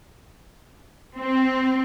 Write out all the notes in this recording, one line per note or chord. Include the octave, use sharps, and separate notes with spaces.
C4